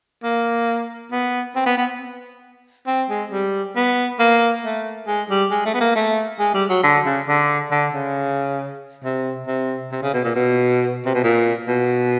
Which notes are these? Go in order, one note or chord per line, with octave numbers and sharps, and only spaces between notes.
A#3
B3
C4
B3
B3
C4
G#3
G3
B3
A#3
A3
G#3
G3
G#3
A3
B3
A#3
A3
G#3
G3
F#3
D3
C#3
D3
D3
C#3
C3
C3
C3
C#3
B2
A#2
B2
C3
B2
A#2
B2